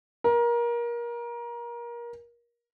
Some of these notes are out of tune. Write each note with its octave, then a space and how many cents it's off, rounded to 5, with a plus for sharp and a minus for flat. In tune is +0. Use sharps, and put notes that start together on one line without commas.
A#4 +25